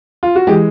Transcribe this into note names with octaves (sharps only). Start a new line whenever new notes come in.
F4
F#4
E3 G#3 G4